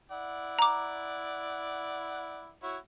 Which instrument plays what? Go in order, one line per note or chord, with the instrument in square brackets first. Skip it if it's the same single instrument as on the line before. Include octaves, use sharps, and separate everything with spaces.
[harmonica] E4 D5 F#5
[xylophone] A#5 D6
[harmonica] E4 F#4 C#5